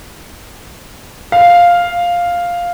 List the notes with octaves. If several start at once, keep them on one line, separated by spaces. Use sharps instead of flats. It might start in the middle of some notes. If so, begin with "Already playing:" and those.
F5